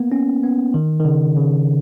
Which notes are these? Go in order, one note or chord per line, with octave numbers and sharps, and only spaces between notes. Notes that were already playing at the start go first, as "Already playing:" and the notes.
Already playing: A#3 B3
C#4
B3
D#3
D#3
C#3
C#3